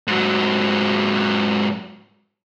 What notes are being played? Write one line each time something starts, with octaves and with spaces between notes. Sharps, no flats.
G#2 F#3